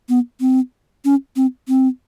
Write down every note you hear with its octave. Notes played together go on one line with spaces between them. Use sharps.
B3
C4
C#4
C4
C4